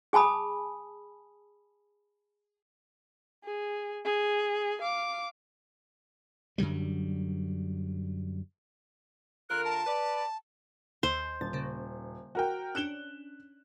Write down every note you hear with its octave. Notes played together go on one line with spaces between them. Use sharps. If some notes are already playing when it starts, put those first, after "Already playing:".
G#4 G#5 A5 B5 D#6
G#4
G#4
F5 D6
F#2 D3 F#3 G3
D3 F4 A#4 F#6
A5
B4 D5
D#2 C5 C6
D#1 A6
C#3 A#3
F#4 A#4 G5
C#4 D4 F#6 E7 G7